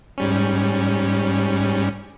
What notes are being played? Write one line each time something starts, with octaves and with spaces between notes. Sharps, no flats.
G#2 G3 C#4